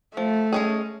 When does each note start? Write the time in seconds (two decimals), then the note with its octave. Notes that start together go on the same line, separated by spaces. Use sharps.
0.16 F3 A3
0.53 G#3 C#4 G#4